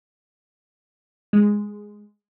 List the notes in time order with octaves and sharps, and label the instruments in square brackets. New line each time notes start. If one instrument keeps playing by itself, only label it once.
[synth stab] G#3